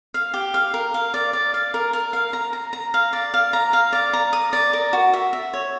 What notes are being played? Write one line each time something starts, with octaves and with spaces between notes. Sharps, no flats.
F5
G4
F5
A#4
F5
D5
D5
F5
A#4
A#4
F5
A#5
A#5
A#5
F5
D5
F5
A#5
F5
D5
A#5
D#6
D5
A#4
F#4
E5
E5
C#5